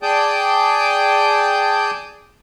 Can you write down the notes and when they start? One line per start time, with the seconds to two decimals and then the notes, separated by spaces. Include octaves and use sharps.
0.03 G#4 D5 G5 A5 D#6 G6